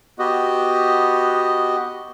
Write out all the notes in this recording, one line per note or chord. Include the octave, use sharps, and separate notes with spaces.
B3 F#4 G4 D#5